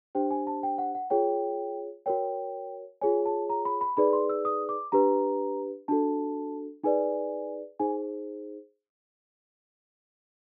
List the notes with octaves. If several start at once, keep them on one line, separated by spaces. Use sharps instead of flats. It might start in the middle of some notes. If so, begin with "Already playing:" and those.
D4 G4 C5 G5
G#5
A5
G5
F#5
F#5
F4 G#4 C#5 G5
F#4 A#4 C#5 G5
F4 G#4 C#5 G#5
A5
A#5
B5
B5
D#4 G#4 B4 D5 B5
C6
E6
D#6
D6
D4 G4 B4 A#5
D4 F#4 A4 A5
D#4 G#4 B4 D5 G#5
D#4 G#4 C5 G#5